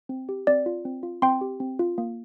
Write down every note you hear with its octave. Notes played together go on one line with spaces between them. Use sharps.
C4
G4
C4 D5
F4
C4
F4
C4 G5 C6
G4
C4
F4
A#3